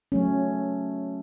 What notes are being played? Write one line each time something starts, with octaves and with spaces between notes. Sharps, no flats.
F#3 A3 C#4